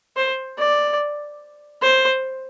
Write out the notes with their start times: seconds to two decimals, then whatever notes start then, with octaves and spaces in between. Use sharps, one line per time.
0.17 C5
0.58 D5
1.83 C5